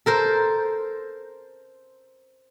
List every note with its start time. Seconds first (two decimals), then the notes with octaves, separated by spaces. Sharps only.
0.06 A4 A#4 C5